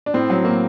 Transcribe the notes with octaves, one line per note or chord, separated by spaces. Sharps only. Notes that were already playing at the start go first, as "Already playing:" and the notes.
D4
A2 C4
F#3
A2 A#3